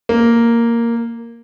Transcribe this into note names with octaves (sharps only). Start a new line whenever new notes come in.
A#3